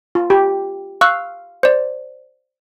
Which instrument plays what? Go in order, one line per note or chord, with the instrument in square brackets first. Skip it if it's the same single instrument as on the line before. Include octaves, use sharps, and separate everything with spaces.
[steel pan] F4
G4
[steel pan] F5 [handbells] C#6 E6 F#6
[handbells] C5 D5